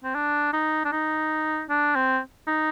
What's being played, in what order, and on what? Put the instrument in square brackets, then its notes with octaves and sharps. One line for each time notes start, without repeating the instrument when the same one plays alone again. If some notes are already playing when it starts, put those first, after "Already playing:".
[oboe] C4
D4
D#4
D4
D#4
D4
C4
D#4